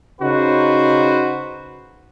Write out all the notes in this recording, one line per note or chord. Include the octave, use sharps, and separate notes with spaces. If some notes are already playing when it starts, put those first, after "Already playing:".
C#3 D#4 F#4 B4 C5